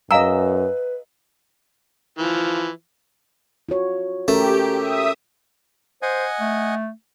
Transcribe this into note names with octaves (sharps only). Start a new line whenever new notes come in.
F#2 B4 D#5 F5 G#5 A#5 E6
E3 F3
F4 F#4 C#5
A3 C#4 G4 A#4
E5 D#6
C5 D#5 F#5 G#5
A3